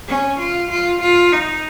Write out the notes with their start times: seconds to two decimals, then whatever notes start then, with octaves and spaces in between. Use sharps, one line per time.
0.08 C#4
0.40 F4
0.70 F4
1.01 F4
1.32 D#4